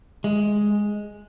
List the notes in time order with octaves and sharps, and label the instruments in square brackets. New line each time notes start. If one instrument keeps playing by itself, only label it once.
[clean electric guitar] G#3